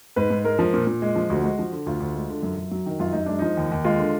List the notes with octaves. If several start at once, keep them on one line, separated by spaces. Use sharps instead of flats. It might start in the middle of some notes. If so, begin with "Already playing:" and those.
G#2 B4
G#2
G#3 A#4
F3
A#2
A#2
G#3
F3
D2 F#4
G#3
F3
D3
D2 F4
D2
G#3
D3
F#2
F#2
F#3
D#3
F#2 F4
F#2 D#4
G#3 D4
F3 D#4
D#2
D#2
G#3 F4
D3